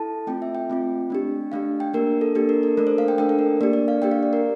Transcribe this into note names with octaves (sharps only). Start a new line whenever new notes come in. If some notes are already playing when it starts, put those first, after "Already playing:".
Already playing: E4 A4 A5
A3 C4 F4 G5
E5
G5
A3 C4 F4
A3 D4 G4
A3 D4 G4 F5
G5
A#3 D4 G4 A#4
A4
A#3 D4 G4 A4
A#4
A4
A3 D4 A4 A#4
C5
F5
G5
A3 D4 A4 G5
A4
A#4
A#3 D4 G4 D5
D5
F5
A#3 D4 G4 G5
F5
D5
A#4